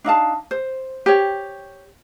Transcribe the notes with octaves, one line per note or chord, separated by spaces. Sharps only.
D4 D#4 F5 A5
C5
G4 C#5